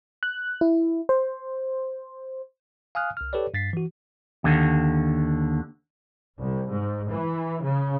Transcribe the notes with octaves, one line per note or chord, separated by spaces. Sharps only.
F#6
E4
C5
F5 G#5 D#6 F6 F#6
C2 F6
G4 A4 B4 C#5 D5
G2 A6 B6 C7
E3 F#4
D#2 D3
C2
G#2
E3
C#3